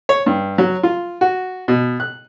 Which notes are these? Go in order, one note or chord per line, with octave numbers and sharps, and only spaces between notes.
C#5
G2
F#3
F4
F#4
B2
F#6